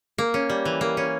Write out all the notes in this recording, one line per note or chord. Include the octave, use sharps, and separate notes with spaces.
A#3
C#4
G3
E3
A#3
C#4